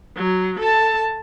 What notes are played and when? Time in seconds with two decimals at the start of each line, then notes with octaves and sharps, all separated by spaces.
0.17 F#3
0.59 A4 A5